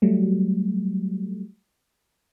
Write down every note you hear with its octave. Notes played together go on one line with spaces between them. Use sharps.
F#3 G3 A3